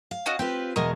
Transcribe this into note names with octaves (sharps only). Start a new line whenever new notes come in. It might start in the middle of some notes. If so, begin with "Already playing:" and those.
F5
C#4 F#4 D#5
C4 F4 G4 B4
E2 B2 G#3 A#4 D#5 C#6